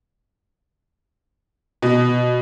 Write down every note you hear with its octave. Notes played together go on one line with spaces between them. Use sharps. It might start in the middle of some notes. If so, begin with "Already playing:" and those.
B2